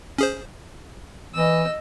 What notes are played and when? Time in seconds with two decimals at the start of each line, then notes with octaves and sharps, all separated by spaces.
0.18 C#4 G#4 C5
1.35 E3 D#5 E6